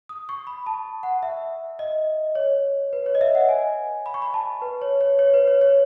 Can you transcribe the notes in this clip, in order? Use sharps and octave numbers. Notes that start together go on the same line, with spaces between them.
D#6
C#6
B5
A5
F#5
E5
D#5
C#5
B4
C#5
D#5
E5
F#5
G#5
B5
C#6
B5
A5
B4
C#5
C#5
C#5
B4
C#5
C#5